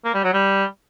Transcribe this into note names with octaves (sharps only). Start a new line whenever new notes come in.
A#3
G3
F#3
G3